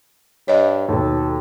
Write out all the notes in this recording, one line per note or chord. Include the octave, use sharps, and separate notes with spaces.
G2 C#5 D#5
D#2 B2 A4